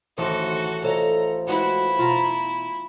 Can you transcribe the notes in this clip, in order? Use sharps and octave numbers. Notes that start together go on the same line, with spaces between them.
A1 D2 D#3 F#4 A4 C5
F3 A4 C#5 D#5 A#5
G#3 E4 F#4 B4 F#5
B2 F4 F5 A#5